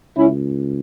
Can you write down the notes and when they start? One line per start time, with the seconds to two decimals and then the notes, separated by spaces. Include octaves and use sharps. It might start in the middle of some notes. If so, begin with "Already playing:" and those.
0.17 C#2 C#4 E4